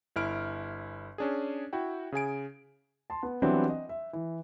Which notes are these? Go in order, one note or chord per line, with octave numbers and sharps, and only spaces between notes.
G1 E4 F6 D7
C#4 D4 G#4
E4 F#4 G5
C#3 G#4 G#5 D7
A5 C6
B3
E3 F#3 G3 B3 C4 D4
D#5
E5
E3